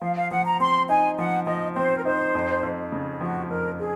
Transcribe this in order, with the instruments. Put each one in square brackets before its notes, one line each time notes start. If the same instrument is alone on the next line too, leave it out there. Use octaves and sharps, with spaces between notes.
[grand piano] F3 [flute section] F5
[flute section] F5
[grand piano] F3 [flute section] F#5
[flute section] A#5
[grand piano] C4 [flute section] C6
[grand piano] D#4 [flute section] G#5
[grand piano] F3 [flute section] F#5
[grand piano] F3 [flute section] D#5
[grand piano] C4 [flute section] C5
[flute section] A#4
[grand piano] D#4 [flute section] C5
[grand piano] F2
F2
C#3
[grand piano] F3 [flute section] F#4
[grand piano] F2 [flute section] A#4
[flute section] G#4